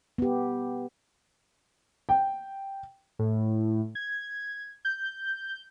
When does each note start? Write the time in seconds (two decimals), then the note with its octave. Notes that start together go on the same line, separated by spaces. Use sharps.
0.18 B3 G4
2.09 G5
3.19 A2
3.95 G#6
4.85 G6